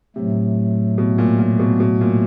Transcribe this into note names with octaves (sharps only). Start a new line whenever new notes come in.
A2 C3 F#3 A3
B2
A#2
A#2
B2
B2
A#2